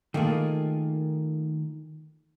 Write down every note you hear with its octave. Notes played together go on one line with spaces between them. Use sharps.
D#3 A3 A#3 F4 G#4